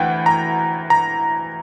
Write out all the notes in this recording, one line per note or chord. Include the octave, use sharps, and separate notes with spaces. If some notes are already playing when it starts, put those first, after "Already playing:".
Already playing: D2 E3 F#5 G5
A#5
A#5